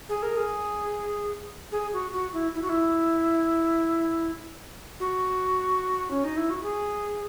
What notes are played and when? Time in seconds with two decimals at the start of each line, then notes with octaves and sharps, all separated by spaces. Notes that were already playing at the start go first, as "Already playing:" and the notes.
0.09 G#4
0.23 A#4
0.37 G#4
1.72 G#4
1.93 F#4
2.13 F#4
2.33 E4
2.55 E4
2.62 F#4
2.69 E4
5.00 F#4
6.11 C#4
6.24 D#4
6.37 E4
6.50 F#4
6.63 G#4